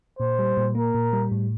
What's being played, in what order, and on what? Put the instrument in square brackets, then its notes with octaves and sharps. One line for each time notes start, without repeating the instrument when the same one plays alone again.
[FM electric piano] A#2 [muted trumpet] C5
[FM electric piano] G3
A#2
[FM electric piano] A#3 [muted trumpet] A#4
[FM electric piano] A#2
G3
A2